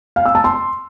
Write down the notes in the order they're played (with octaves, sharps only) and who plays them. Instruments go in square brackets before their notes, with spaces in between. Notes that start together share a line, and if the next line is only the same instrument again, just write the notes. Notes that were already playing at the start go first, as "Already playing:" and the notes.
[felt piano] F5
E6
A5
C6